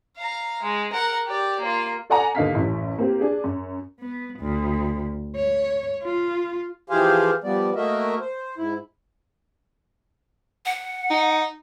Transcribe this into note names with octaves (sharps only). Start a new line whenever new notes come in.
F5 A#5
G#3
A#4 F#5
G4 D5
A#3 F4
A4 D5 F#5 G#5 A#5
D#2 D3 D#5 F5 B6
A1 F#2
A#3 C4 G4
D4 G#4
F#2
B3
D2
C#5
F4
E3 F3 G4 G#4 C5 F5
F3 G3 B3 D5
A3 A#3 F#4 A#4 D#5 E5
C5
G#2 E4
F#5
D#4